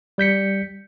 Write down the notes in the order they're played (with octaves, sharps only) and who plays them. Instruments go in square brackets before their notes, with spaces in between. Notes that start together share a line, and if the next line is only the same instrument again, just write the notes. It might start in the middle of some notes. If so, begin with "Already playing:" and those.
[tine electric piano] G3 G6 B6 C#7